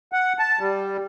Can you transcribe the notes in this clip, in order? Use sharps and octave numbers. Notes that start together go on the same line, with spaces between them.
F#5
A5
G3